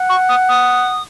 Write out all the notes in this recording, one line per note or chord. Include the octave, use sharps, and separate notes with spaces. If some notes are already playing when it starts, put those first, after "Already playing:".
Already playing: F#5
C#6
D#6
D#6